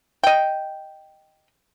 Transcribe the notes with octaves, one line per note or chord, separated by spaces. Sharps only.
D#5 G5